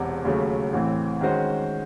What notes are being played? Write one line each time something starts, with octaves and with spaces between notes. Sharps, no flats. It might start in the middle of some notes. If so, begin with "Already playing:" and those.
Already playing: E1 E2 C3
D#2 C#3 F#3 A3
A1 A2 E3 C4
D#3 G#3 C#4 F#4 C5